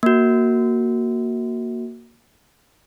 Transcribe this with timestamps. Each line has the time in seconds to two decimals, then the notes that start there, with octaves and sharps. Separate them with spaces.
0.03 A#3 F#4